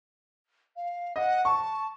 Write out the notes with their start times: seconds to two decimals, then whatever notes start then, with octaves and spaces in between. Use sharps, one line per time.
0.76 F5
1.16 D#5 F#5
1.45 A5 C#6